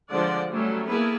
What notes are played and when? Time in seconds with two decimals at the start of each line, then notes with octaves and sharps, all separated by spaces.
0.10 D3 F3 G#3 D5 F#5
0.51 F#3 G3 A3 C#4
0.88 A#3 B3 E4 G#4 A4 B4